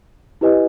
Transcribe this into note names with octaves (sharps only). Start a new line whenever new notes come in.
E4 G4 B4 D#5 G#5